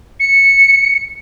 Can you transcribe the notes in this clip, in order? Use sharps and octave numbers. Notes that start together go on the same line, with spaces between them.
C#7